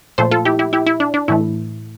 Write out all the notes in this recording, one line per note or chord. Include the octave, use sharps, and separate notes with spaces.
A#2 F3 A3 A4 C5
F4 A4
E4 G4
E4 G4
E4 G4
E4
D4
D4
A2 E3 A3 E4